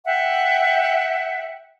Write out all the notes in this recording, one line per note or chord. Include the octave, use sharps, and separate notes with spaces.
E5 F#5 G5